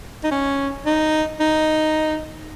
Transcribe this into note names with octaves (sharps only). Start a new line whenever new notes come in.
D#4
C#4
D#4
D#4